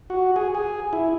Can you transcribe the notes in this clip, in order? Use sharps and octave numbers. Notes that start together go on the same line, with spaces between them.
F#4
G#4
G#4
E4